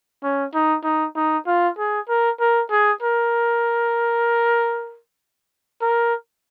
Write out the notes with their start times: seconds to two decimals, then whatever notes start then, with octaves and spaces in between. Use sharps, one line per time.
0.23 C#4
0.54 D#4
0.84 D#4
1.16 D#4
1.47 F4
1.78 G#4
2.08 A#4
2.40 A#4
2.71 G#4
3.03 A#4
5.82 A#4